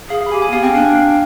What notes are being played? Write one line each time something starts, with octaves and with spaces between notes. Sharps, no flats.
G#4 F5
F5
B5
G4 G#5
G#5
B3 F5
C4 G5
D4 F5
G5
F5